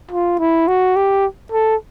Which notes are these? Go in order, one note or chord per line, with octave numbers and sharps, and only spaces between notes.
F4
E4
F#4
G4
A4